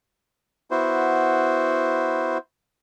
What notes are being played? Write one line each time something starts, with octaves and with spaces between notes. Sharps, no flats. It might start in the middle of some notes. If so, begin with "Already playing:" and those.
B3 E4 F#4 C5